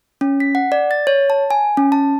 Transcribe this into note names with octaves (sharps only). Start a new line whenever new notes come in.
C#4
B6
F#5
D5
A6
C#5
A5
G#5
C#4
A5